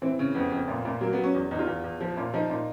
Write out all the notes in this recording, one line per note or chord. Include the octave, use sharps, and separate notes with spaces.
E3 C4
C#3
F2 B3
F2
A#2
A#2
F#3 A#3
F#3 B3
C#4
E2
E2 D#4
F4
E2
E2
F3
A#2
F3 D#4
A#2